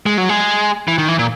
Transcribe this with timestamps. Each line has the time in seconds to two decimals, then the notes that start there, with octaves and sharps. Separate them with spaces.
0.06 G#3
0.18 F#3
0.29 G#3
0.88 E3
0.98 D#3
1.08 E3
1.19 A#2